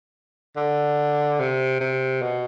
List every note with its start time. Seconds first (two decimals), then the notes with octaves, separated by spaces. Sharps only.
0.56 D3
1.40 C3
1.80 C3
2.22 B2